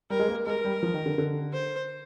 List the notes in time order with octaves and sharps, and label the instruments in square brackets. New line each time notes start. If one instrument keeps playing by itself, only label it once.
[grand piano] G3 [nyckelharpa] A#4
[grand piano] G#3
A#3
[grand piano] G#3 [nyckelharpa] A#4
[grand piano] G3
F3
D#3
D3
D3
[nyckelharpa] C5